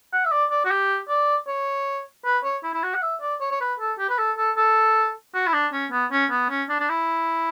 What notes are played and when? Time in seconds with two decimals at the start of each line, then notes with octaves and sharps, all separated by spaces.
0.13 F#5
0.25 E5
0.32 D5
0.51 D5
0.65 F#4
0.71 G4
1.09 D5
1.47 C#5
2.25 B4
2.44 C#5
2.63 E4
2.74 E4
2.83 F#4
2.95 F#5
3.02 E5
3.21 D5
3.41 C#5
3.51 C#5
3.61 B4
3.79 A4
3.99 G4
4.09 B4
4.18 A4
4.38 A4
4.57 A4
5.35 F#4
5.47 E4
5.53 D4
5.72 C#4
5.92 B3
6.12 C#4
6.31 B3
6.50 C#4
6.69 D4
6.80 D4
6.89 E4